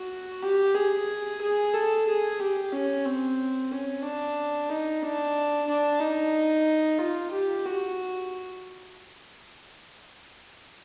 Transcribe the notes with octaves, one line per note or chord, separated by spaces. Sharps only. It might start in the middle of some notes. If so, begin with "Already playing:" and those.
Already playing: F#4
G4
G#4
G#4
A4
G#4
G4
C#4
C4
C#4
D4
D#4
D4
D4
D#4
F4
G4
F#4